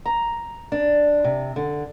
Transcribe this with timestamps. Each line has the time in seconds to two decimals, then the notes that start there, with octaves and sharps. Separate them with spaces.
0.06 A#5
0.72 D4
1.24 C3
1.56 D3